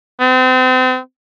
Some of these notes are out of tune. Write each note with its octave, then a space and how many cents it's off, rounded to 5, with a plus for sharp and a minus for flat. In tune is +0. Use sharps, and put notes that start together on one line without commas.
C4 -35